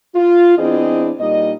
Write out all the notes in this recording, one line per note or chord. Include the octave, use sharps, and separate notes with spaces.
F4
E2 C4 D4 E4 G#4 D#5
A#2 G3 D#4 D#5